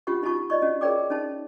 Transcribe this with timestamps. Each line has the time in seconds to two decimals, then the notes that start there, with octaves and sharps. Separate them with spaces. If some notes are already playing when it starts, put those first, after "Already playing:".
0.07 C#4 F4 G4 F#5 C#6
0.23 D#4 F4 F#4 A5 C#6
0.50 D5 D#5 C#6
0.62 C#4 F#4
0.81 G#4 A#4 C#5 D5 G5 D6
1.10 C#4 D#4 A5